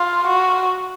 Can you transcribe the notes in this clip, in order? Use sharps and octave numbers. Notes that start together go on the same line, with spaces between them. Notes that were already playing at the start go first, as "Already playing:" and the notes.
Already playing: F4
F#4